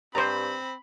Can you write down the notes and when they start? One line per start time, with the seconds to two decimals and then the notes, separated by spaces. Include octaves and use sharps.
0.15 G2 C4 C5 A#5 B5